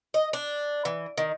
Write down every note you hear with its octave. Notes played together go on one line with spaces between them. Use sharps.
D#5
D4
E3
D#3